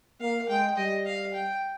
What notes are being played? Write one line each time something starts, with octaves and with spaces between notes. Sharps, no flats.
A#3 F5
G#3 G5
G3 D#5
F5
G5